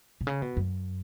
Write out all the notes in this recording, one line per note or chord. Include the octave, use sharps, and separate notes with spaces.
B2
C#3
B2
F#2